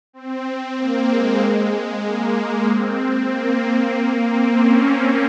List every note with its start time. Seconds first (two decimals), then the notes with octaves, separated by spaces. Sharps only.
0.13 C4
0.77 A#3
1.09 G#3
2.04 A#3
2.67 C4
3.30 A#3
3.94 A#3
4.26 C4
4.58 C#4